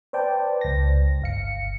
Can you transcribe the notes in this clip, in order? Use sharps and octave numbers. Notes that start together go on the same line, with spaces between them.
B4 C5 D5 G5 A5
C#2 A#6
G1 F5 C#7